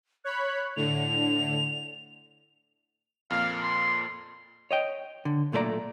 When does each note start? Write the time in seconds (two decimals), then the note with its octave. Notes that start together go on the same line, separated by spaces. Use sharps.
0.25 C#5 B5 F#6
0.76 A2 D3 F7
3.30 F2 A#2 A#3 F5
3.63 C6
4.71 C#5 D#5 G5
5.25 D3
5.52 B1 A#2 A3 A4 D5 A#5